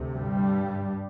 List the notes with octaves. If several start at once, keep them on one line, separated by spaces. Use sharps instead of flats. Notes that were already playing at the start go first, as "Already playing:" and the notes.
Already playing: D2 C3
G2 G3